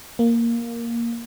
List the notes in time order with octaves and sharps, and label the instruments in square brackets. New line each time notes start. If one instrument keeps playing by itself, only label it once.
[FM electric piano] A#3